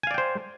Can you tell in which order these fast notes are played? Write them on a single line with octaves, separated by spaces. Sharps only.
G#5 F5 D5 G5 C5